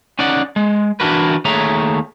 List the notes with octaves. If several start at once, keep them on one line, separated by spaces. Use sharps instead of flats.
C#4 D#4 D5 F#5
G#3
E3 D4 E4 F#4 A#4 B4
D#2 A3 G#4 C#5 E5 A#5